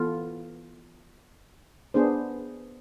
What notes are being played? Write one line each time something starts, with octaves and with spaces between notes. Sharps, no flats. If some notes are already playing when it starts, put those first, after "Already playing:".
Already playing: E3 B3 F4 A4
B3 D4 G#4 C5